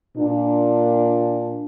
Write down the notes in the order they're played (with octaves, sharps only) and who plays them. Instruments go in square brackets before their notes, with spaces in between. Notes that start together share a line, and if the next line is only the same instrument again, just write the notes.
[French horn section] A#2 D4